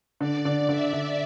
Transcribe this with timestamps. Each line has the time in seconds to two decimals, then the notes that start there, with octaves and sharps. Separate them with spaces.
0.20 D3 D5
0.45 D3
0.69 D3 E5
0.93 D3